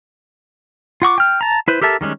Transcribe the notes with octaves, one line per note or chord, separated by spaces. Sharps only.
F4 F#5 C#6 D6
G5 F6
A5 A#5
E4 B4 C5
G4 A4 A#4 E5 A5
D#3 G3 G#3 C#4